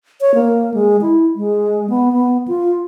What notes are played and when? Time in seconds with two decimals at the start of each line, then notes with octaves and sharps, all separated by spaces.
0.21 C#5
0.35 A#3
0.74 G#3
1.01 E4
1.36 G#3
1.90 B3
2.13 B3
2.48 F4